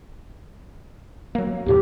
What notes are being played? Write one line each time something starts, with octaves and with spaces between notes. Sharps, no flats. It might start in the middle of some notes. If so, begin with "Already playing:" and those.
F#3 A#3
D#2 A2 C3 G4